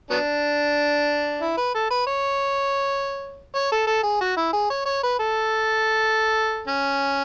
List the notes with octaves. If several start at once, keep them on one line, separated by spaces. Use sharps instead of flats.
F#3 B3 D4
E4
B4
A4
B4
C#5
C#5
A4
A4
G#4
F#4
E4
G#4
C#5
C#5
B4
A4
C#4